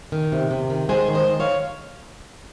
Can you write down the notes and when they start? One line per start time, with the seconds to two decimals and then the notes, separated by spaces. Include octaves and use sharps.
0.12 D#3
0.32 C3
0.51 C3
0.70 D#3
0.89 G#3 G#4 C5
1.08 D#3
1.14 C5 D#5
1.27 D#3
1.40 C#5 F5